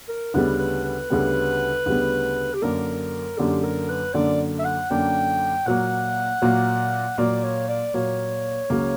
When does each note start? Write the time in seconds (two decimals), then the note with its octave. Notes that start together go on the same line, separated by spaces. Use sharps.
0.09 A#4
0.34 D2 C#3 G3 B3 B4
0.59 B4
0.84 B4
1.10 D2 C#3 G3 B3
1.86 D2 C#3 G3 B3
2.54 G4
2.62 F#2 D3 A#3 D4 A#4
3.38 F#2 D3 A#3 D4 G4
3.64 A#4
3.89 B4
4.14 F#2 D3 A#3 D4 D5
4.59 E5
4.65 F#5
4.90 F#2 D3 A#3 D4 G5
5.66 A#2 F#3 A#3 F#5
6.42 A#2 F#3 A#3
7.18 A#2 F#3 A#3 D5
7.44 C#5
7.68 D5
7.94 A#2 F#3 A#3 C#5
8.70 C#2 C#3 F#3 A#3 C#4